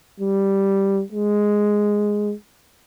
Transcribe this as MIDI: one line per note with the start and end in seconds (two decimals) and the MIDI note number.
0.20 1.02 55
1.12 2.34 56